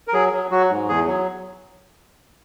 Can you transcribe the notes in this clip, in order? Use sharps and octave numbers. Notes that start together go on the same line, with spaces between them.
A#4
F#3 G#4
F#3
F#3 F#4
G#2
E2 G#4
F#3